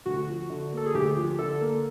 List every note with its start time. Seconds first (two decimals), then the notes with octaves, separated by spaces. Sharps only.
0.06 D2 F#4
0.28 F3
0.50 D3
0.73 A#3 A4
0.86 G#4
0.95 D2 G4
1.17 F3
1.39 D3 A4
1.61 A#3